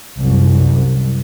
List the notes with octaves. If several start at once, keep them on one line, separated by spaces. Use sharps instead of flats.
C2 F#2